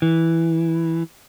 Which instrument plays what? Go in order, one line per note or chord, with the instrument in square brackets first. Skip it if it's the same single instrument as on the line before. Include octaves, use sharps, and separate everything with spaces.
[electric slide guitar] E3